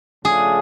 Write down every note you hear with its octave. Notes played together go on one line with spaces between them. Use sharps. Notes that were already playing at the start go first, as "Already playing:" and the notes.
C#3 F3 A3 D4 F4 G#4